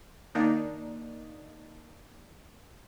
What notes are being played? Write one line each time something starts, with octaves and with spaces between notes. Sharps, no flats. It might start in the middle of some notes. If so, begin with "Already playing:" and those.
D#3 A#3 D4 D#4